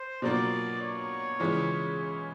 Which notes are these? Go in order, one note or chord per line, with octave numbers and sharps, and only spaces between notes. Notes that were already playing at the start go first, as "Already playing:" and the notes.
Already playing: C5
B2 F#3 A#3 D4 F4 D5
C#5
C#3 E3 G#3 C#4 F4
C#5